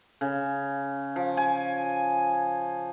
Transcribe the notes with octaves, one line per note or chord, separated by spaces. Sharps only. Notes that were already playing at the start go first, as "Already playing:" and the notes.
C#3
F3
G#5